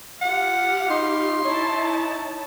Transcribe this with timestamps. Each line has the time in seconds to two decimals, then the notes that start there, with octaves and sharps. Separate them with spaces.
0.21 F4 G4 F5 F#5
0.90 D#4 C6
1.45 D#4 E4 C#5 A5